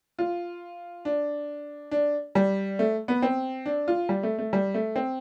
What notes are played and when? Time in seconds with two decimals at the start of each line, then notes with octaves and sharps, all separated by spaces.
0.19 F4
1.05 D4
1.91 D4
2.35 G3
2.79 A3
3.08 B3
3.23 C4
3.66 D4
3.88 F4
4.09 G3
4.23 A3
4.38 A3
4.53 G3
4.74 A3
4.96 C4